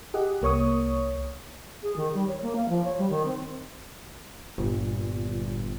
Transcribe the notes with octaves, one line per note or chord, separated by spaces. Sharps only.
G4 G#4 D#5 F#5
C2 A#3 C#5 C#6 D#6
G#4
D#3
G3
C#5
A#3
F5
F3
C#5
G3
D#3
C4
G1 A#2